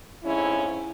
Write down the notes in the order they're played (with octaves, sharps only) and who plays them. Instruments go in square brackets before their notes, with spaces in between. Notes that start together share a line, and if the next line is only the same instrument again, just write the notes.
[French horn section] F2 G#2 C#4 E4